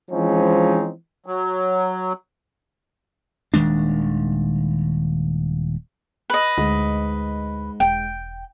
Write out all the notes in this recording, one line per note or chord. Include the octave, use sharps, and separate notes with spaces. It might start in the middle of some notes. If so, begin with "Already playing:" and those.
E3 F3 G#3 C4 C#4 D#4
F#3
D#1 D#3 G#3 D4
B4 D#5
D2 G#2
E1 G5